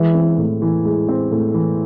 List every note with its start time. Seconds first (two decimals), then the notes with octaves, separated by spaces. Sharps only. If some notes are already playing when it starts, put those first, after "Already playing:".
Already playing: E3 G#3
0.14 C4
0.38 A2
0.62 E3
0.85 G#3
1.09 C4
1.31 A2
1.54 E3